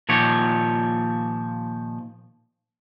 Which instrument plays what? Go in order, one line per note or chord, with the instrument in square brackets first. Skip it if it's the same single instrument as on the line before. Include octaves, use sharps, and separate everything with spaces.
[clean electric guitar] A#2 D#3 F3 G4 C#5